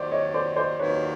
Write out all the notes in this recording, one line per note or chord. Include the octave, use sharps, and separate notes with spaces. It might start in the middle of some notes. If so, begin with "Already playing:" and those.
Already playing: D#2 D#3 F#3 C5 D5
C#5 D#5
C5 D5
C5 D5
D#2 D#3 F#3 B4 C#5